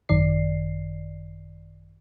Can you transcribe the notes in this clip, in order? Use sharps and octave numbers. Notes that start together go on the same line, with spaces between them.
G#1 F#2 D#3 D5 C7